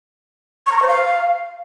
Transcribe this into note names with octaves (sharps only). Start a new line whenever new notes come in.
C#6
A#5
C#6
C5
F5